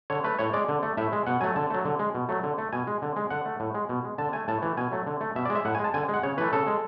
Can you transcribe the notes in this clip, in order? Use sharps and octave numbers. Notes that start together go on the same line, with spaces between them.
D3 C#5
A3 B4
A2 C#5
G#3 D5
D3
A3
A2 E5
G#3
B2 F#5
F#3 A3 G#5
D3 A5
F#3 A3
D3
G#3
B2
F#3 A3
D3
A3
B2 G#5
G#3
D3
G#3
D3 F#5
A3
A2
G#3
B2
G#3
D3 A5
A3 G#5
A2 A5
E3 A3
B2 G#5
F#3 A3
D3
A3
B2 E5
D5
G#3
E5
A2 F#5
G#5
G#3
A5
D3 G#5
G#3
F#5
C#3 C#5
E3 A3 B4
C#3 A4
G#3